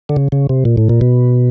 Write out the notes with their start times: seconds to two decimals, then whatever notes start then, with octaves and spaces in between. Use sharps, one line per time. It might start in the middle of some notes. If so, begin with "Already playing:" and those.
0.09 D3
0.16 C#3
0.32 C#3
0.49 C3
0.65 A#2
0.77 A2
0.89 A#2
1.01 B2